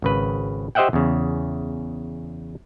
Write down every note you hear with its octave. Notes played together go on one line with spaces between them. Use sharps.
G#1 C#3 B4
G4 C5 D#5 E5 F#5 G5
E2 C#3